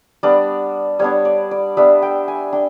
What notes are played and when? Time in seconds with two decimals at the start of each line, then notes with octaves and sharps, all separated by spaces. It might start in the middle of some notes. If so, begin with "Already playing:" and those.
0.23 G3 B3 D4 D5
0.99 G3 B3 D4 C#5
1.25 D5
1.51 D5
1.77 G3 B3 D4 E5
2.02 G5
2.28 G#5
2.53 D4 G5